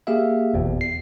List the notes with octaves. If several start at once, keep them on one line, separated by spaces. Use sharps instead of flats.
A#3 G4 G#4 E5 F5
G1 E2 B2
C7